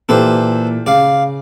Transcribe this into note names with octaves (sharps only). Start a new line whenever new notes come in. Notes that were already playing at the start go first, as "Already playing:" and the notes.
A#2 E3 G4 A4 B4 C5
C#3 D5 F5